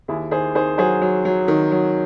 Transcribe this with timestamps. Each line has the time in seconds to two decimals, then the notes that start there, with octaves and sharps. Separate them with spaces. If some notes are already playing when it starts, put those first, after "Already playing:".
0.08 D#2 E4 G#4
0.31 D#3 G#4 C5
0.55 D#3 G#4 C5
0.78 F#3 G#4 C5
1.02 F#3
1.25 F#3
1.48 D#3
1.72 F#3